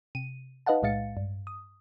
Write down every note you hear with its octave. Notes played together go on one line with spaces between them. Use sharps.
C3 D#7
D#4 B4 D#5 F5 F#5 A5
B1 A2 G#3 F5 A6 C#7
G2
D#6